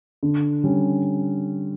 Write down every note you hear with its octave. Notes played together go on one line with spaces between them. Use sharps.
D3
G3 C#4